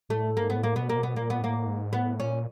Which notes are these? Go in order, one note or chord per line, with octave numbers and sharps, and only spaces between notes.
A2 A3
G#2 A#3
B3
A2
A#3
B2 B3
A#2 A#3
B2
B3
A#2 A#3
B3
A2 A#3
G#2
A2 B3
A#2 C#4